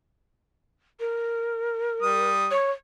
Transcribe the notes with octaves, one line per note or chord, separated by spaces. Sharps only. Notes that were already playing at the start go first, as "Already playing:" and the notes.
A#4
G3 D#6
C#5